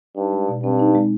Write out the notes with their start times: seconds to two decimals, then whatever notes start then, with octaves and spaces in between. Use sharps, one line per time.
0.16 G2 D#4
0.32 G#3
0.48 B2
0.63 G2 C4
0.79 D#4
0.95 G#3